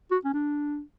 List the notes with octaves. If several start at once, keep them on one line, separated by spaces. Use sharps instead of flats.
F#4
C#4
D4